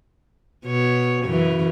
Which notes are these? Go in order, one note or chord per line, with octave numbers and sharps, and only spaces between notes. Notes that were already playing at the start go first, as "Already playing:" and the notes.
B2 C#5
F#2 C#3 E3